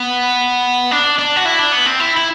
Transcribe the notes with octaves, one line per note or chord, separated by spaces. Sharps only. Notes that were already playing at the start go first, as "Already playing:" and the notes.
Already playing: B3
D4
D4
F#4
E4
D4
B3
C4
E4
E4